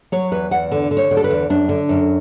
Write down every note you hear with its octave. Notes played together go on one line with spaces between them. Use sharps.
F#3 C#5
E2 B4
E2 F#5
D3
D3
C#5
D3
A4
B4
E2
F#2 D4
D3
F#2